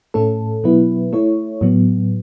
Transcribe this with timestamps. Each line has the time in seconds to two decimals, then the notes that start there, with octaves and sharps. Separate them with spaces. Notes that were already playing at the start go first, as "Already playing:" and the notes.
0.14 A2 A3 C#4 A4
0.63 B2 F#3 B3 E4 B4
1.13 A3 E4 C#5
1.61 A2 F#3 B3